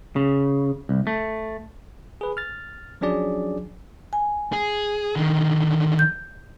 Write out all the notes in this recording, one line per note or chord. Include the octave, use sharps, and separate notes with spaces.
C#3
C2
A3
G#4 B4
F6 A6
F3 F#3 C#4 D4 G#4 D5
G#5
G#4
D3 D#3
G6